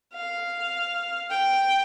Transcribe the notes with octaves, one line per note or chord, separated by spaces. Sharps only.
F5
G5